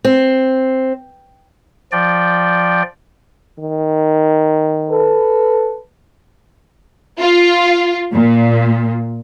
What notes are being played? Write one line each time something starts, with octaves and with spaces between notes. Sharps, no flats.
C4
F3 D5 G5
D#3
A4 B4
F4
A#2